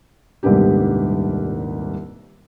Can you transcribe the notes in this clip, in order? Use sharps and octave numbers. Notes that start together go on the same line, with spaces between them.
D#1 C2 G#2 B3 D4 G4